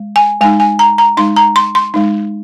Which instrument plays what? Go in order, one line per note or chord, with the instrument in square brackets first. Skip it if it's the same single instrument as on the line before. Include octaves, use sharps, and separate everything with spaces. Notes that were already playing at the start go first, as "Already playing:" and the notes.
Already playing: [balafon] G#3
G#5
G#3 D#4 G#5
G#5
A#5
A#5
G#3 D#4 C6
A#5
C6
C6
G#3 D#4